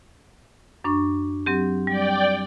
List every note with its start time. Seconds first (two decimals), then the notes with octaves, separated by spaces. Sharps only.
0.84 F#2 D4 C#6
1.46 F#3 C4 G4
1.87 G3 D5 G5